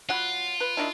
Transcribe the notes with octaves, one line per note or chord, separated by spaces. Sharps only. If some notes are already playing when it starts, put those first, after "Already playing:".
F#3 F4 F#5 B5
B4
D#3 D4 E4